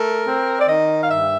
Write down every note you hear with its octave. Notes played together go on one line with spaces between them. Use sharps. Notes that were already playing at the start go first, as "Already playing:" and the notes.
Already playing: A3 A#4
C4
D5
D#3 D#5
F5
G2 E5